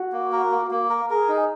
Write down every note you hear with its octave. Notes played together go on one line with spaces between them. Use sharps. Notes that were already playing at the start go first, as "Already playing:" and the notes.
Already playing: F#4
A#3
A#4
A#3
A#3
A#4
G#4 A#4
D#4